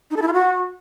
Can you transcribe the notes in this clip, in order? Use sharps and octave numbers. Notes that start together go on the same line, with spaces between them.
D#4
A4
E4
F4
F#4